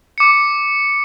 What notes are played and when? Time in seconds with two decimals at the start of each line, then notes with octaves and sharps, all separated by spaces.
0.18 D6 C#7